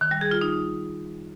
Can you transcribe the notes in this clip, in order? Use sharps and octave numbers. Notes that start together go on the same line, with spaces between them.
D#3
G3
G#4
F4
D#4